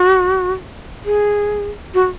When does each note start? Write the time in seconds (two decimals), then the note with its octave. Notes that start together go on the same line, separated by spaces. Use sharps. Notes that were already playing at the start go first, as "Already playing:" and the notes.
Already playing: F#4
1.05 G#4
1.94 F#4